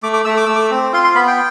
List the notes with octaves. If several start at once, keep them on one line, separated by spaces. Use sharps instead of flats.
A3 D6
D6
A3 E6
D6
A3 E6
D6
C4
F4 C6
C6
B3 B5
G5